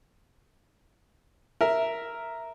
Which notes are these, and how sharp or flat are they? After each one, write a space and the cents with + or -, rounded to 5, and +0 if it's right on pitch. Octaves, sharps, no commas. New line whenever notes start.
A#4 +0 E5 +0